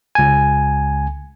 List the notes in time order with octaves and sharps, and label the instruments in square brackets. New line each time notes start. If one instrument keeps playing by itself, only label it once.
[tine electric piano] C#2 G#5